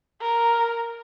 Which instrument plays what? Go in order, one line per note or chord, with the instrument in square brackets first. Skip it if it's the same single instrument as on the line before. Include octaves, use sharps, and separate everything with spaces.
[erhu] A#4